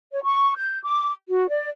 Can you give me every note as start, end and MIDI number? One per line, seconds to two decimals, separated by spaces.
0.12 0.22 73
0.23 0.57 85
0.57 0.79 91
0.83 1.13 86
1.29 1.47 66
1.49 1.69 74